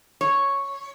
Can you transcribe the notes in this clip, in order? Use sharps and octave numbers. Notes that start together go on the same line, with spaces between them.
C#5